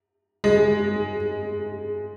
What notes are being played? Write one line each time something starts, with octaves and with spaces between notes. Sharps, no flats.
G#3